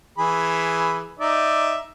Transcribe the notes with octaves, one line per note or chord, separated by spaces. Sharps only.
E3 G#4 B5
D#4 D5 E5